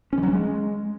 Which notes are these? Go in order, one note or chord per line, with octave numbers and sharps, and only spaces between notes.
C#4
E3
F#3
C#4
G#3